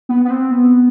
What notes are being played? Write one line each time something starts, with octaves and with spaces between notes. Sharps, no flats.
B3
B3
C4
B3